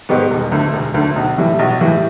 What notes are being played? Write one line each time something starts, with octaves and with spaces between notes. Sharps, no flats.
G#2 D#3 G3 B3
E1
D2 D3
E1
D2 D3
B1
A2 E3 G3
B1
A2 E3 G3